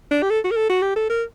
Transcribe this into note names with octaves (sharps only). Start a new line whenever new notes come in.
D4
G4
A4
F#4
A#4
A4
F#4
G4
A4
A#4